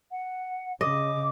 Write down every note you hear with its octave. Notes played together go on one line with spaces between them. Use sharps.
F#5
C#3 D#5 D6